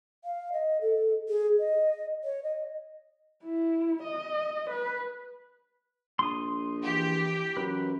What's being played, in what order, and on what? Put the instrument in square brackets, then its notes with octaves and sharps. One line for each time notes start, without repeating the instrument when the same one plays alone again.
[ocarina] F5
D#5
A4
G#4
D#5
C#5
D#5
[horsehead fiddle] E4
D#5
B4
[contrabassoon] A#1 [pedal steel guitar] C6 D#6
[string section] E3 G4
[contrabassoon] F#2 [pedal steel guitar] B4